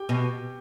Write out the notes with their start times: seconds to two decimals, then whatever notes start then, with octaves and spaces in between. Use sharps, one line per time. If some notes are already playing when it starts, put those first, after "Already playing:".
Already playing: G4 G5
0.09 B2